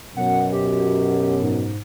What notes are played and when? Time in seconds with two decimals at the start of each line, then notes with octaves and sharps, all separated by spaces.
0.17 F#2 B2 F#5
0.53 G4
1.42 G#2